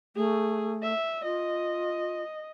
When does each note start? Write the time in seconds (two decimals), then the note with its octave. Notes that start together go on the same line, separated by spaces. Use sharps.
0.16 A3 G#4
0.82 E5
1.24 F4 D#5